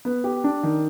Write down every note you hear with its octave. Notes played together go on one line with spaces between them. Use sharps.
B3
G4
D4
D#3